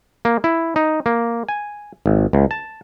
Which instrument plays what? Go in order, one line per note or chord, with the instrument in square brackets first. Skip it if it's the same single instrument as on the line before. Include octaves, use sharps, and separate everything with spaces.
[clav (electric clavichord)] A#3
E4
D#4
A#3
G#5
G#1
C#2
A5